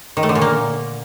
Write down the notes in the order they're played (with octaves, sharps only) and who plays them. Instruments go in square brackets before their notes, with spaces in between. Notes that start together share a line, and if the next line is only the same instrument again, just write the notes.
[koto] D#3
A3
D3
A#2
A#3